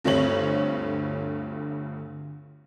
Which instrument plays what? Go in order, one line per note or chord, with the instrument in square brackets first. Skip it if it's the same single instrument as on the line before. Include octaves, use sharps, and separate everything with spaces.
[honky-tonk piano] G1 D2 G2 C4 C#5 F#7